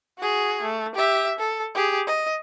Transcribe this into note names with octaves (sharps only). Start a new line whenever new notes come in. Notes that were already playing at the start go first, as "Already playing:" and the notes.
F#4 G#4
A3
G4 E5
A4
G4 G#4
D#5